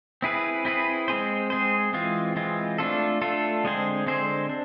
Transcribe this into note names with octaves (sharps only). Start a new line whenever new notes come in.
C4 E4 G#4 B4
C4 E4 G#4 B4
G#3 C4 G#4 C5
G#3 C4 G#4 C5
E3 G#3 C4 F4
E3 G#3 C4 F4
A3 D4 F4 A4
A3 D4 F4 A4
D3 G#3 C4 G#4 C5
D3 G#3 C4 G#4 C5
D4